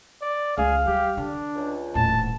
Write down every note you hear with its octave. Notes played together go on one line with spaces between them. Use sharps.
D5
C#2 G#4 F5
G3 G4
D3 D4
C#2
D#1 A2 A5